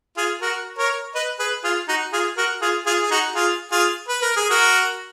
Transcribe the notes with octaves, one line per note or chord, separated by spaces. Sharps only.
F4 G#4
F#4 A#4
A#4 C#5
B4 D#5
G#4 B4
F4 G#4
D#4 F#4
F4 G#4
F#4 A#4
F4 G#4
F4 G#4
G#4
D#4 F#4
F4 G#4
F4 G#4
B4
A#4
G#4
F#4 A#4